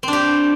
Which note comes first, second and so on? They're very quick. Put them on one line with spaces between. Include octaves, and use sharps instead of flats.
C4 D4 G4